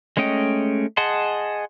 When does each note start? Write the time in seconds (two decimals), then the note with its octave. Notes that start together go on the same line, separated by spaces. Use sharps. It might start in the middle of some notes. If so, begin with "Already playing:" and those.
0.17 G#3 A3 C#4 D#5 G5
0.97 G#4 D#5 F#5 A5 C6